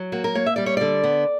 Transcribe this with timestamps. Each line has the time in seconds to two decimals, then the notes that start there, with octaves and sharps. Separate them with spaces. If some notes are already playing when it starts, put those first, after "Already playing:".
Already playing: F#3
0.12 A#3 F#4
0.24 A#4
0.35 A#3 C#5
0.46 E5
0.56 G3 D5
0.66 C#5
0.77 D3 D5
1.04 B3